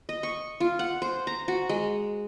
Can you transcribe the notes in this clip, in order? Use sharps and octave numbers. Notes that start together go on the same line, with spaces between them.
D#5
C#6
F4
F#5
C5
A#5
F#4
G#3